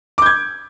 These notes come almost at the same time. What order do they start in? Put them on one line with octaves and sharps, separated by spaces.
D6 G6 G#6